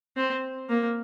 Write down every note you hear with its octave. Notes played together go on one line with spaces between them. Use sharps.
C4
A#3